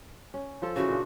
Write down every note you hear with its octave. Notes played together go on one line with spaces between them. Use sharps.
C#4
F3 F4 A4
C#3 E3 F#4
A#2 D4